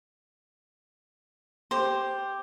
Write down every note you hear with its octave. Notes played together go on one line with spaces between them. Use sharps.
G4 C5